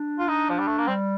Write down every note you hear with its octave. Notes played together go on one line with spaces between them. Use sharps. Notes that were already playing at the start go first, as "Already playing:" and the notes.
Already playing: D4
F4
D#4
F3
G3
A3
A#3
G3 C4